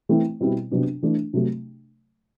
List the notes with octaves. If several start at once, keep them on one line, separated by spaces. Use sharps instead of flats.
E3 A3 C4 E4
B2 G3 C4 E4
C3 F#3 B3 D4
E3 A3 D4
C3 F#3 A3